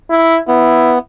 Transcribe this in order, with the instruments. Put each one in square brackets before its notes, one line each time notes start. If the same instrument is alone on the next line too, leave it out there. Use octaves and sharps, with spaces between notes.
[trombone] E4
[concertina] B3 [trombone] E4